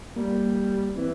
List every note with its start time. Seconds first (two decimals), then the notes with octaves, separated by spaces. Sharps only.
0.16 G3 A#3
0.96 E3 C4